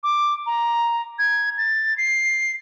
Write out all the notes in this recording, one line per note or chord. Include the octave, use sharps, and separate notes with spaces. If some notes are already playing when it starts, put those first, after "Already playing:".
D6
A#5
G#6
A6
C7